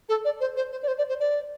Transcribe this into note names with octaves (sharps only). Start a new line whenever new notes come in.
A4
D5
C5
C5
C5
D5
C5
D5
C5
D5